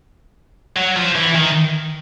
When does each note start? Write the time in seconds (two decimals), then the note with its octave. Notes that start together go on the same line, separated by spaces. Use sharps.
0.76 F#3
0.96 F3
1.15 E3
1.35 D#3